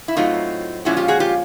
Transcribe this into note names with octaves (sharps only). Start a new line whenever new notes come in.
E4
A2 F#3 A3 C4 D#4 F4
A#2 F3 G#3 C#4 E4 F#4
F4 G4
F#4 G#4
F4 G4